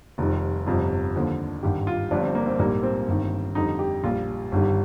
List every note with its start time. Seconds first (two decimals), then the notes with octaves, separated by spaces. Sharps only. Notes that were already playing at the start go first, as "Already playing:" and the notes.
0.18 F1 F2 D#3 G3
0.66 G1 F2 C3 G3 F4
1.15 D#2 D3 F3
1.63 G#1 G2 D#3 G4
1.87 F4
2.11 G1 G2 F3 D4
2.23 C4
2.35 A#3
2.47 C4
2.59 A#1 G#2 G3 A#3
2.83 C4
3.08 G1 G2 D#3
3.55 F2 D3 G3 D#4
3.79 G4
4.04 A#1 A#2 G3 F4
4.52 G1 G2 D#3 G3